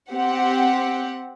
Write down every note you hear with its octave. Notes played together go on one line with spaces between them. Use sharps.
C4 G4 F#5